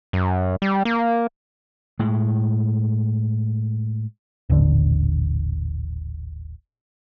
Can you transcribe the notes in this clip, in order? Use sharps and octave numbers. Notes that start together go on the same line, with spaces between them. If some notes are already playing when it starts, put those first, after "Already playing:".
F#2
G3
A#3
A2 G#3
D#1 A1 D3